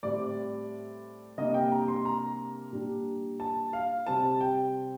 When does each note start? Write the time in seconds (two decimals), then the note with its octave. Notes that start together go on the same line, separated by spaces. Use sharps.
0.03 A2 G3 C4 D5
1.38 C3 G3 A#3 D4 D#5
1.54 G5
1.72 A#5
1.88 C6
2.05 A#5
2.72 A#2 G3 D4
3.40 A5
3.73 F5
4.07 C3 G3 C4 A5
4.41 G5